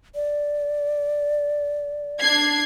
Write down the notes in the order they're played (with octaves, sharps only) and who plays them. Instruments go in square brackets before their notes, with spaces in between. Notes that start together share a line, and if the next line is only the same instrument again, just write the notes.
[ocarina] D5
[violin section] D4 G#6 C7